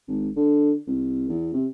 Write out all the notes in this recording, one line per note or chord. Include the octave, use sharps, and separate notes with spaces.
G#1
D3
C2
E2
C3